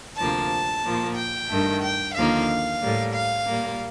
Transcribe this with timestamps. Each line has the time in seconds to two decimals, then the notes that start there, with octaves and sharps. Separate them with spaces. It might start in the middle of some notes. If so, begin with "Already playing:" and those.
0.18 D2 C3 F3 A#3 A5
0.85 A#2 F3 A#3
1.17 G5
1.50 G2 D#3 A3
1.83 G5
2.15 D#2 D3 F3 A#3 F5
2.82 A2 G3 A#3
3.14 F5
3.47 A#2 G3 A#3